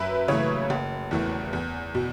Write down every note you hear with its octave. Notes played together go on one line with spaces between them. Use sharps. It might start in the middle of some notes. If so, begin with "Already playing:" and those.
Already playing: F#2 B4 E5
C#3 E3 A3 C#5
F#1
E2 E3 A3
E2
B2